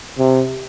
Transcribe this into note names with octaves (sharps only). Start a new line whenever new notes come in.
C3